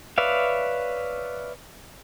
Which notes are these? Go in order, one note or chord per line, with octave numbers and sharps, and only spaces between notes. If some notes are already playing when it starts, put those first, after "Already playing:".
B4 C#5 D5 E5 F5